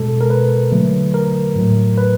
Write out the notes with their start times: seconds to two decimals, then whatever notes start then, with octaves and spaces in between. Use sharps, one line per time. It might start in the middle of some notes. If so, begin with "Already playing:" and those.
Already playing: B2 G#3 A4
0.21 A#4
0.30 B4
0.72 D3 F#3 A3
1.14 A#4
1.56 A2 F#3 A3
1.98 B4